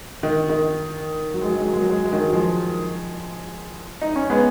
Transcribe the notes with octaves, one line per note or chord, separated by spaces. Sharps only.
D#3
D#3
F#3
G#3
F#3
G#3
F#3
G#3
F#3
G#3
F#3
G#3
D#3 F#3
F3 G#3
D#4
C#4
G#3 B3